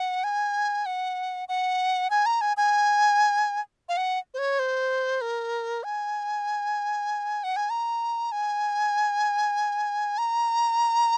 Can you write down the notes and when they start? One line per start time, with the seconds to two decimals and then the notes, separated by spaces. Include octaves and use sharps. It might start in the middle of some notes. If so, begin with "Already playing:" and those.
Already playing: F#5
0.24 G#5
0.86 F#5
1.49 F#5
2.10 G#5
2.26 A#5
2.41 G#5
2.57 G#5
3.89 F5
3.97 F#5
4.34 C5
4.38 C#5
4.59 C5
5.21 A#4
5.84 G#5
7.44 F#5
7.56 G#5
7.70 A#5
8.32 G#5
10.18 A#5